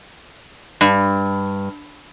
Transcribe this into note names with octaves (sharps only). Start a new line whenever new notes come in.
G2